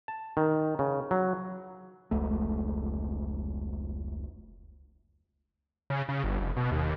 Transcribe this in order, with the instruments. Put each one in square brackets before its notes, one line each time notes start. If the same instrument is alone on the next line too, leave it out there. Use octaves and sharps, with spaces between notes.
[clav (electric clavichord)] A5
D#3
C#3
F#3
[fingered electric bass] F1 C#2 A3
[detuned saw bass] C#3
C#3
G1
F1
B2
D#2